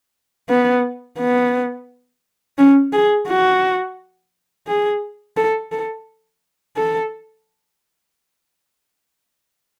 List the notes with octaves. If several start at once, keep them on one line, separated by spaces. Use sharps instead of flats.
B3
B3
C#4
G#4
F#4
G#4
A4
A4
A4